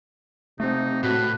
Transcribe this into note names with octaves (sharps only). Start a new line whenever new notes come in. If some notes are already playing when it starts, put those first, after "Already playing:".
C3 A3 C4 D#4
A2 F#4 B4